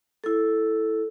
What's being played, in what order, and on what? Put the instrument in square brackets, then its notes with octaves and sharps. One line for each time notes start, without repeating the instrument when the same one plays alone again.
[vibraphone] E4 A4